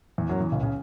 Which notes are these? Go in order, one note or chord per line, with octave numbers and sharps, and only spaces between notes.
E2 E3
F#2 F#3
E2 E3
C#2 C#3
C#3